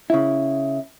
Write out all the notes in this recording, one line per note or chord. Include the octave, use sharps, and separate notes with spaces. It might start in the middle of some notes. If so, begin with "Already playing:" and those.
C#3 E4